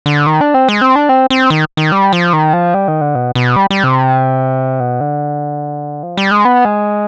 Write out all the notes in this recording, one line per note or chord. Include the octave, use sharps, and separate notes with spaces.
D3
D#3
D4
C4
G#3
C4
D4
C4
C4
D#3
D#3
G3
F3
D#3
F3
G3
D#3
D3
B2
B2
G3
G3
C3
B2
D3
F3
G3
G#3
B3
G#3